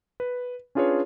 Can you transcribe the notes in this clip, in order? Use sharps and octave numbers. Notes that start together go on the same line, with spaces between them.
B4
C#4 D4 F4 G#4 B4 C#5